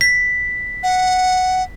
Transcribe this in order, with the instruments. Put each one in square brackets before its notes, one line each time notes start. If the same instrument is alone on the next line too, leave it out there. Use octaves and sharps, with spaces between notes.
[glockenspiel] B6
[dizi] F#5